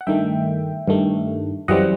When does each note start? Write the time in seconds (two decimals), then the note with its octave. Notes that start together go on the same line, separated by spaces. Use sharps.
0.01 F#5
0.07 G2 D#3 A3 E5 G5
0.87 G2 D#3 A3
1.68 F#2 E3 G3 C4 D#5 F#5